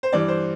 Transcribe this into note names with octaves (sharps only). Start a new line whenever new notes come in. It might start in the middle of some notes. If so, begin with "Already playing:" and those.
C5
G2 E3 D5
C5